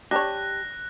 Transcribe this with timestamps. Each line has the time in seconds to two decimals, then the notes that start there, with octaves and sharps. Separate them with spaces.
0.11 D4 G4 C#5 A5 B5 F#6 A#6